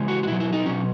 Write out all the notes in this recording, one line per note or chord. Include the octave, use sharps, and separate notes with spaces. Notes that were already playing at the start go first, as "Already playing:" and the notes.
Already playing: C#3 E3 G#3
F#4
F#4
B2 E4
F#3
E4
D#4
B2 F#3 C#4